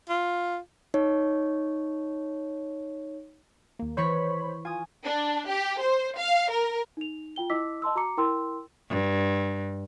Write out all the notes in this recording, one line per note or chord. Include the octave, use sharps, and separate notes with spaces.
F4
D#4 C#5
D#2 A#3
E3 C5 C#5 B5 C#6 B6
F4 G#5 D#6
D4
G4
C5
F5
A#4
D#4 F7
F4 G5 G7
E4 D#5 D6 E6 B6
D#5 A5 C6 E6
F#4 A#5 D6 C#7
E4 A#4 G5 C6 E6
G2